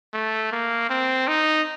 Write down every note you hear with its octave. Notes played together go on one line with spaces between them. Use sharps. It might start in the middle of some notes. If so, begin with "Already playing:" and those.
A3
A#3
C4
D#4